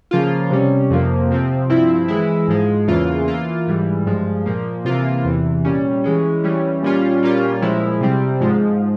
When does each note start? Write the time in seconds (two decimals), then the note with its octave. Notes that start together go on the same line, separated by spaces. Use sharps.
0.11 C#3 F3 A#3 F4
0.50 C3 G3 C#4
0.90 F2 C3 F3 A#3
1.31 C3 F3 C4
1.69 G2 F3 C4 E4
2.08 E3 G#3 E4
2.48 G#2 F3 G#3
2.88 E2 C#3 E3 A#3 F4
3.28 E3 A#3 F4
3.67 G#2 E3 G3
4.06 G2 F3 G#3
4.46 A#2 F3 A#3
4.85 C3 E3 A#3 F4
5.25 E2 C3 E3
5.65 A#2 G3 C#4
6.04 E3 G#3 C#4
6.44 E3 G3 C#4
6.83 A#2 G3 C#4 F4
7.22 A#2 G3 A#3 C#4 F4
7.62 A#2 F3 G#3 E4
8.01 C3 G3 C4
8.40 G#2 F3 G#3